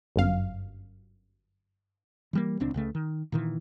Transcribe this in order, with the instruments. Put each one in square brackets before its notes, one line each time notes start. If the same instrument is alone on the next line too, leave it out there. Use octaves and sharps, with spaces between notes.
[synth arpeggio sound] G1 F#2 F5
[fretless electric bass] E3 G3 A#3
D#1 C#2 C4 D4
C#2 C#3 A3
D#3
A#2 D#3 E3